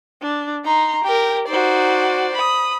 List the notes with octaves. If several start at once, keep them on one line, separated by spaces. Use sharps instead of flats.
D4
D#4 A#5 C6
G4 A#4 G5
D#4 F#4 C5 D5
B5 D#6